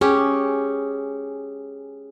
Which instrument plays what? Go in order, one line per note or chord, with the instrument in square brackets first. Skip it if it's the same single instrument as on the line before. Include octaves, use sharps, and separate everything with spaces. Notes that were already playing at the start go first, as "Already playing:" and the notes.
[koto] C#4 G4 [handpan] G#4